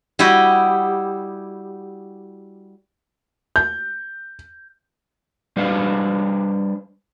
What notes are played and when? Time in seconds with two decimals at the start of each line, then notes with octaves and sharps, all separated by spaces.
0.19 G3 E4 F#4 G4 D#5
3.56 G6
5.57 G3 D4 B4 C5 F5